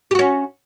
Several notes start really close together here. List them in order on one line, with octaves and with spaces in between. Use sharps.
G4 F#4 C#4